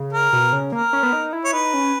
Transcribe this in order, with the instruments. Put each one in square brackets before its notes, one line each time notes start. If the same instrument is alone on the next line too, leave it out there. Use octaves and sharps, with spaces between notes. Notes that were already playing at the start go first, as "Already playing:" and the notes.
Already playing: [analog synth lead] C#3
[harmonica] A#4
[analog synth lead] B2
C#3
[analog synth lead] A#3 [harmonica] A#4
[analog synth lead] C#4
B3
D#4
E4
[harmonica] C#5
[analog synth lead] D#4 [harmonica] B4
[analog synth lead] C#4